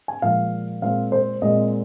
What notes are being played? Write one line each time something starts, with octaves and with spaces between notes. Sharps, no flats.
G#5
A#2 F3 G#3 F5
A#2 G#3 C4 F5
C5
A#2 G#3 C4 D#5